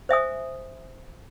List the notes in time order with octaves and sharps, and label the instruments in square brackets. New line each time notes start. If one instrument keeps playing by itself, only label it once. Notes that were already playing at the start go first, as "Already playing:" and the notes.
[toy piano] C5 E5 G#5 D#6